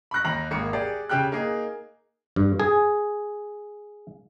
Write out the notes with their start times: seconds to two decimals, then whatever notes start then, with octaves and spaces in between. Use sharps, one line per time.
0.11 B5 C#6 F#6 A#6
0.25 D#2 A#5 A#6 F#7
0.51 G#1 A#3 C#7
0.73 G4 G#4 D5
1.09 C#3 G4 G5 F#6
1.32 A#3 D#4 G#4
2.36 G2
2.60 G#4